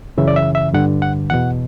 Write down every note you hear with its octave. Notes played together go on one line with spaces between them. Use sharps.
F#2 C#3 E3 E5
D5
E5
E5
G2 D3 F#5
F#5
E2 B2 F#5